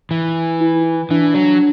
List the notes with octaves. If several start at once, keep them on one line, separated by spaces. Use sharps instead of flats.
E3
E4
E3 D4
F#3